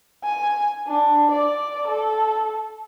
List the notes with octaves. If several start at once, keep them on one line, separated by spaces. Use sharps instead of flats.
G#5
D4
D5
A4